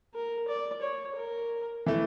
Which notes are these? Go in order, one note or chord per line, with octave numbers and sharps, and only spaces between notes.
A#4
D5
C#5
A#4
E3 A3